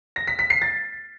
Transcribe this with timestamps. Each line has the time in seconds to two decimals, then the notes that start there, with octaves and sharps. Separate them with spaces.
0.16 A#6
0.27 B6
0.39 B6
0.50 C7
0.62 A6